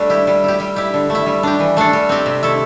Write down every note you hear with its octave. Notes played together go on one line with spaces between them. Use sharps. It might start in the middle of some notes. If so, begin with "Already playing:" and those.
Already playing: G3 A3 D4
E4 G4
G3
E4 G4
G3
E4 G4
D3
A3
E4
G3
D4 G4
E3
A3 D4 A4
G3
C4 G4
C3
A3 E4 A4